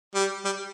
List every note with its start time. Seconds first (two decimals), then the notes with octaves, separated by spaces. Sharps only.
0.15 G3
0.45 G3